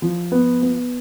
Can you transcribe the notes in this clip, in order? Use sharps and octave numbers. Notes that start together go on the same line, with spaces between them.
F3
B3
B3